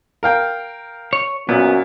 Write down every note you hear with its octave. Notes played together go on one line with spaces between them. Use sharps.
A#4 F5 G5
C#5
F#2 A#2 B3